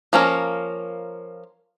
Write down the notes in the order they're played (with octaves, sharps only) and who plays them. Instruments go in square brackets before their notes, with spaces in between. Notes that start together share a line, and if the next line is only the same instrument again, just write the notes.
[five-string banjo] F3 A#3 C#4 A#4